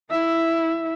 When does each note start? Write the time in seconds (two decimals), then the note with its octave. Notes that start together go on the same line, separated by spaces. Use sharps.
0.10 E4 E5